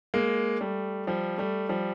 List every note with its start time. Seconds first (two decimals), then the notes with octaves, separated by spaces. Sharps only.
0.14 G#3 A#3
0.61 G3 A3
1.07 F3 G3
1.38 G3 A3
1.69 F3 G3